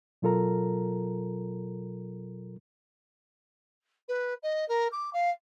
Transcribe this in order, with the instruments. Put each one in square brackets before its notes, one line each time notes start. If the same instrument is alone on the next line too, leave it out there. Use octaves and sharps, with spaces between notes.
[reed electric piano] B2 F#3 F4 A4 A#4 A#5
[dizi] B4
D#5
A#4
D6
F5